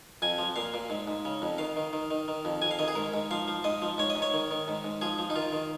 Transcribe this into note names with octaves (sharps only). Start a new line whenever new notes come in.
F2 G#5
F3
A#2 F5
A#2
G#2
G#2
C#3
F2
D#3 F5
D#3
D#3
D#3
D#3
F2
F2 G#5
F5
D#3 D#5
G#4
G#2 A#4
G#2
F3 F5
F3
G#2 D#5
F3
G#2 C#5
D#5
G#2
C#5
D#3
D#3
G#2
G#2
F3 G#4
F3
D#4
D#3 F4
D#3